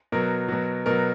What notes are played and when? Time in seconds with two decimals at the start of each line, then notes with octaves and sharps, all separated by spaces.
0.12 B2 F#3 A#4
0.48 B2 F#3
0.86 B2 F#3 A#4